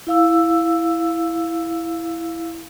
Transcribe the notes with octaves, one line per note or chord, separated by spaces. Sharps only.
E4 F5 E6